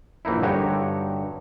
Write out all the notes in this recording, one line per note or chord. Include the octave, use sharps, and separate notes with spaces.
A#1 E3 A#3 D#4 E4
G2 D3 D#4 F#4 G4 C#5